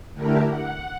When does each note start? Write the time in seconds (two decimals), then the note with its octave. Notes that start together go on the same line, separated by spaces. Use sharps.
0.13 D3 A3 D4 E4 G4 A#4
0.48 F#5